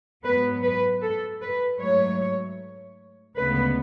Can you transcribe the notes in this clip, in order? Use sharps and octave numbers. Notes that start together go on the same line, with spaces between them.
G#2 F#3 B3 B4
B4
A4
B4
G#2 F#3 A3 C#5
D2 C#3 G#3 B3 B4